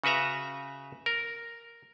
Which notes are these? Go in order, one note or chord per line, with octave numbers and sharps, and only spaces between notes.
C#3 F#4 B4 E5 A#5
A#4